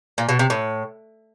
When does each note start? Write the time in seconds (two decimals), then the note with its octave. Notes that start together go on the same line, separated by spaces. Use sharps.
0.18 A#2
0.29 B2
0.39 C3
0.50 A2